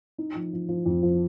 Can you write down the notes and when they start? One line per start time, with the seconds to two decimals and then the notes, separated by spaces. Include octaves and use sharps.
0.18 D#4
0.35 F3
0.53 F3
0.69 F3
0.86 F2
1.03 F3